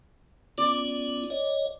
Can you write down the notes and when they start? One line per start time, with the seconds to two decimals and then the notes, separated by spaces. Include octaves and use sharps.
0.58 B3 C#4 F4 D5
1.30 C#5 D#5